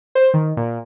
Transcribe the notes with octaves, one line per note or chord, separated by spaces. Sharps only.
C5
D#3
A#2